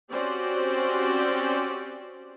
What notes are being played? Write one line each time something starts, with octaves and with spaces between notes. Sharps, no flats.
C4 C#4 F#4 G4 C5 D5